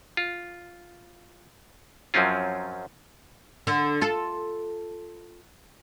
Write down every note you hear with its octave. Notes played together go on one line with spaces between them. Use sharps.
F4
F#2 F3 F#3 C4 C#4 F4
D3
F4 A4